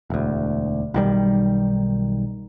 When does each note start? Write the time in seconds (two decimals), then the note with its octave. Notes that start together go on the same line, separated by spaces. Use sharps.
0.10 E1 D2
0.94 B1 D#3 G3